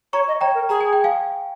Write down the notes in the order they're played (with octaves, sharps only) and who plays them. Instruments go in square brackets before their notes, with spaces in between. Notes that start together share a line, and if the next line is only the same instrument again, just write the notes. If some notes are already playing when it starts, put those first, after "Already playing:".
[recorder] C#5 [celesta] A#5 C#6
[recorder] D#5
[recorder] C#5 [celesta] G5 A#5
[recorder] A#4
[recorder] G#4 [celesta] A#5
[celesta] G#5
G5
F5 G#5